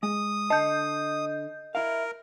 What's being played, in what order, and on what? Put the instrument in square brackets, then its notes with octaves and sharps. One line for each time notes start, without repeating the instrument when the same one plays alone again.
[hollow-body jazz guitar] G#3 [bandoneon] D#6
[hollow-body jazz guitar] D3 A5 [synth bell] D#5 G6
[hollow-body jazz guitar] E4 F5 [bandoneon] A#4